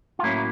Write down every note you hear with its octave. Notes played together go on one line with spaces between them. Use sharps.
F4
A2 F#3 A#3 C#4 E4